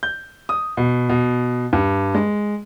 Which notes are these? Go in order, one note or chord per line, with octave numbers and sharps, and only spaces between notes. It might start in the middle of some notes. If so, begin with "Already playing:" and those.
G6
D#6
B2
B2
G2
G#3